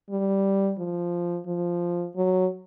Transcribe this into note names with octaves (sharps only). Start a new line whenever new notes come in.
G3
F3
F3
F#3